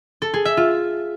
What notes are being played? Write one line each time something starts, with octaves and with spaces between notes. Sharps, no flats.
A4
G#4
E5
F4